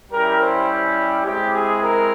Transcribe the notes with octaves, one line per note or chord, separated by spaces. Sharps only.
G3 C#4 E4 G4 A#4
C5
G#3 C4 E4 G4
G#4
A#4